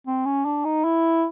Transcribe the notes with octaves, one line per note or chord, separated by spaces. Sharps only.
C4
C#4
D4
D#4
E4